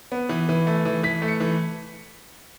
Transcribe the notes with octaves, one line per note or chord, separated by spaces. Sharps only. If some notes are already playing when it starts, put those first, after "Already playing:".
B3
E3
E3
A3
E3
E3 B6
A3
C#7
E3